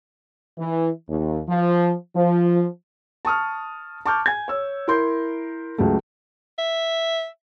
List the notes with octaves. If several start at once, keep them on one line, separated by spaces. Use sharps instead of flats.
E3
D#2
F3
F3
A5 C#6 D#6 F6
A5 C#6 D6 F6 G6
G#5 G#6
C#5 E6
E4 A#4 C6 G6
C#2 C#3 F#3 A3
E5